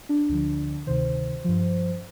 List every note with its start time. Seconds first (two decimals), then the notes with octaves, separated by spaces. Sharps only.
0.09 D4
0.29 D2 D3 F3
0.87 D2 C3 D#3 C5
1.44 G2 F3